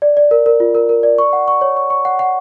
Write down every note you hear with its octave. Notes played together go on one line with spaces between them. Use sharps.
D5
D5
A#4
A#4
F4
A#4
A#4
D5
C#6
F#5
C#6
C#5
C#6
C#6
F#5
F#5